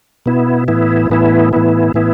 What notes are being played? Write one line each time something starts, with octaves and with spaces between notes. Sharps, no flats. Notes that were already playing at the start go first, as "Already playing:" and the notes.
B2 B3 E4
A2 E3 B3 E4
A2 E3 B3 E4
A2 E3 B3 E4
A2 E3 B3 E4